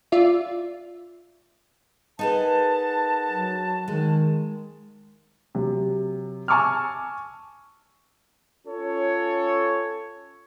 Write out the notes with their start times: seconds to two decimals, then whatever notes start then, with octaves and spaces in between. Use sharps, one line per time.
0.12 F4 D5 E5
2.19 D#4 G#4 A#4 B4 F#5 A5
3.30 F#3
3.88 D#3 G#3
5.55 C3 F#3
6.48 G#5 A5 C#6 D6 E6 F6
8.67 C#4 F4 A4 C#5